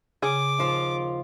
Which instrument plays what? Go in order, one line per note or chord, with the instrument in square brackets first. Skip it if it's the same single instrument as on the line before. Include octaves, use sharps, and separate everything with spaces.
[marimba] C#3 [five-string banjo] G#4 [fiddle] D6
[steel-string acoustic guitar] D#2 F3 F4